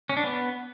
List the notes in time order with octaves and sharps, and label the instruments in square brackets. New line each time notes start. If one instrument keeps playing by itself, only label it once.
[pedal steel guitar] C#4
D4
B3